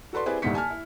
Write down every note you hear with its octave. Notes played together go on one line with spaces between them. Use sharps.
F#4 A4 B4 D5 C6
C4 E4 G4 G#4 B4 D5
D#1 D2 G2 D#4 B6 C#7
G#5 A5 F6
E4